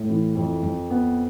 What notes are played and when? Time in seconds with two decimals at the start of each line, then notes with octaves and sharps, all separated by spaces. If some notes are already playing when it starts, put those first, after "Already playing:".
Already playing: A2
0.09 E3
0.36 F2
0.63 F2
0.90 B3